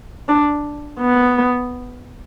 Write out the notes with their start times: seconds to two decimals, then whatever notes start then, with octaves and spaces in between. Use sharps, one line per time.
0.28 D4
1.00 B3